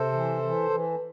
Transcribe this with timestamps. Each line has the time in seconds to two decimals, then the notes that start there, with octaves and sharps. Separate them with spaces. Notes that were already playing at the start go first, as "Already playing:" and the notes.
Already playing: C3 A4 C5
0.12 E3
0.42 E3
0.70 E3